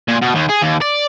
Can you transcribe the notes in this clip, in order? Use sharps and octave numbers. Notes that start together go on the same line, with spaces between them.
A#2
B2
D#2
G#4
D#2
D5